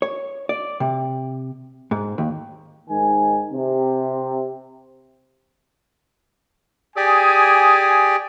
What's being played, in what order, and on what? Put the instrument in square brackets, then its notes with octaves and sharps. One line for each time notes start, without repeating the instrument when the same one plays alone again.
[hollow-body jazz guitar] C#5
D5
C3
G#2
D#2
[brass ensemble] G#2 D#3 G#5
C3
[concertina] G4 G#4 D5 [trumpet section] G#5 D#6